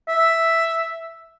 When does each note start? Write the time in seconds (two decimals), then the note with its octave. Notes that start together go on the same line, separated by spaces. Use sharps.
0.08 E5